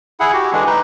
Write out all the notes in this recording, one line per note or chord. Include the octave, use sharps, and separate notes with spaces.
E4 G#4 F#5
F#4 G4
D3 E3 G#3 D4
D#4 B4